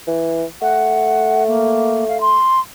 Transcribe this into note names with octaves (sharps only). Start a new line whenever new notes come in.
E3
A3 F#5
A#3
F5
C6